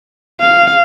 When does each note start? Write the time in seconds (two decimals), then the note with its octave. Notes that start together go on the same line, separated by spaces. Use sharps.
0.40 F5